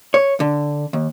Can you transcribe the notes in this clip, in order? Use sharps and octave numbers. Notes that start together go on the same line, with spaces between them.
C#5
D3
D#2